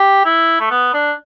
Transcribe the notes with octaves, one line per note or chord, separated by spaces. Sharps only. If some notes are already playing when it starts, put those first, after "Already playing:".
Already playing: G4
E4
A3
B3
D4